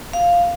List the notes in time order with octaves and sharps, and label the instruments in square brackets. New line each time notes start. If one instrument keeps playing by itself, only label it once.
[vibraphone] F5